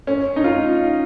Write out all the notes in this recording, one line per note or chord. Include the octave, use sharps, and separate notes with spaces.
C#4
D#4
F4